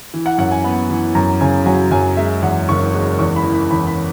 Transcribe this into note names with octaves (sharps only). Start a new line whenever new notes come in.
E3
F#5
F#2 F#5
G#5
B3
E3
F#2 A#5
C#3 G#5
F#3 G#5
F#2 G#5
G#3 E5
E2 F#5
F#1 C#6
G#3
E2 C#6
B5
E3
B5
E2 B5
B5